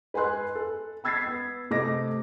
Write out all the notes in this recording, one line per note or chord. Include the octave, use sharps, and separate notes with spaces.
B4 G#5 B5 C6 F#6
A4
B5 E6 G#6 A6 B6 C7
B3
C3 A3 C4 D#5 D6 A#6